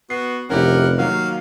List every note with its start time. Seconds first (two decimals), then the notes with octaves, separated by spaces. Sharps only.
0.10 B3 F#4 C7
0.50 F1 C#4 E4 G4 A#4 F#5
0.98 D#3 F#3 A#3 F#4 F5